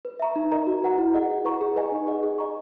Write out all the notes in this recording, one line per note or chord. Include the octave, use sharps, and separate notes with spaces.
B4
E5 A#5 C#6
D#4
A#4 D#5 A#5
F#4
B4 F#5 A#5
E4
G#4 D#5 F#5
G#4
B4 F#5 A#5 C#6
G#4
B4 D#5 G#5
D#4
G#4 D#5 F#5
G#4
D#5 A#5 C#6